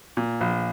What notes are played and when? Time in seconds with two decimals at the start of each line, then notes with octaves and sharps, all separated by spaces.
0.17 A#2
0.41 A#1